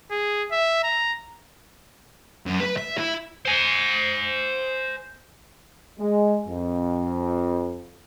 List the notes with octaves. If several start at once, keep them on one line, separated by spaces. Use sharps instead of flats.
G#4
E5
A#5
F#2
B4
E5
E4
C5 G#5
G#3
F2